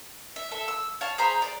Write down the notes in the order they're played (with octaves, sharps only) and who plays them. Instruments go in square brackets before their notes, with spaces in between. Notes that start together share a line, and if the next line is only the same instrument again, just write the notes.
[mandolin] E5
A4 E5
E6
C#5 F5 A5
G#4 C5 A#5 B5
D5